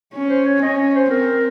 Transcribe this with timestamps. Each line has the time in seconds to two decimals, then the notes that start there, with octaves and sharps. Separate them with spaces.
0.14 C#4
0.30 C5
0.46 C#5
0.62 C#4 D#5
0.95 C5
1.11 C4 A#4